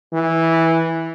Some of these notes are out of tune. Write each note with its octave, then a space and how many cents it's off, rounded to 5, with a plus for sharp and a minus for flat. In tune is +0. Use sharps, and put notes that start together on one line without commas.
E3 -10